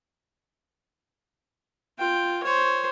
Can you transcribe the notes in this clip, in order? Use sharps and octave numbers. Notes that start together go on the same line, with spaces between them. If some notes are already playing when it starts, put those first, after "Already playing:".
F4 G5
C5 C#5